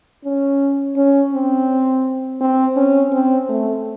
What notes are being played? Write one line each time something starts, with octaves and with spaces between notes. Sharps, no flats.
C#4
C#4
C4
C4
C#4
C4
A3